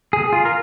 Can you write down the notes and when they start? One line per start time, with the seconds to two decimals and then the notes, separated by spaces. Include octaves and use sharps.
0.13 G#4
0.33 F4
0.45 A#4